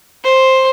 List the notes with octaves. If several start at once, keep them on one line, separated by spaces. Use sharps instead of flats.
C5